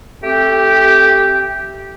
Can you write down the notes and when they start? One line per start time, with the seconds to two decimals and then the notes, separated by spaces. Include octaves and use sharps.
0.24 A3 C4 G4